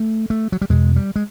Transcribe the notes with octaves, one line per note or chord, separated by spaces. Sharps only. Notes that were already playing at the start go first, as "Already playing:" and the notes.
Already playing: A3
A3
F#3
G3
E2 B2 G#3
G3
G#3